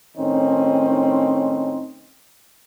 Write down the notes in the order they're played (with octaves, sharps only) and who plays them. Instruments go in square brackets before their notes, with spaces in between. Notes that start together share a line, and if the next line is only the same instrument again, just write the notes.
[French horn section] A2 D#3 C4 C#4 D#4